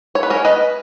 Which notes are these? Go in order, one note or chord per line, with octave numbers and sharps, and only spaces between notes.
C#5
B4
C#4 A#4 C#5
B4 D#5